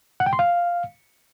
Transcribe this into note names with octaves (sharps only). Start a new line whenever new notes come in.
F#5
G5
C6
F5